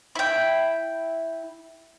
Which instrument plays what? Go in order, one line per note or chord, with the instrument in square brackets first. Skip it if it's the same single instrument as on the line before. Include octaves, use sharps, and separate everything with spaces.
[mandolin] E4 G5